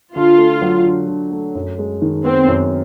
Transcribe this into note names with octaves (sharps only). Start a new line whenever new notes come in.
D3 F4
A3
F#3
D3
D3
A3
F#2
G#3
D#3
B3 C4
F#2